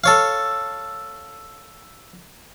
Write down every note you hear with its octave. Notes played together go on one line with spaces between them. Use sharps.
A4 C#5 F5